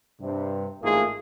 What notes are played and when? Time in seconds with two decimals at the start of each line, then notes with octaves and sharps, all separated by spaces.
0.21 G2 C3
0.82 A1 G#2 A3 A#3 F4 G#4